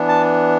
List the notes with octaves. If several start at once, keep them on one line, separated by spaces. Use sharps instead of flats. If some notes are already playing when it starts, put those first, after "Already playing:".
Already playing: E3 B3 D4
A5